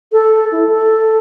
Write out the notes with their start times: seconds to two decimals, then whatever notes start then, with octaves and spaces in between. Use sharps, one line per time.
0.12 A4
0.52 E4
0.69 A4